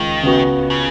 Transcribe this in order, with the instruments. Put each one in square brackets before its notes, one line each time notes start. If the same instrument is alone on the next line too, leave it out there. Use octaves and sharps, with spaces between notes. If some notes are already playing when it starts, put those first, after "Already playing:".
Already playing: [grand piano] C#2 [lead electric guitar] D#3
[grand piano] C#3 B3 F#4
[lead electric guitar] C#3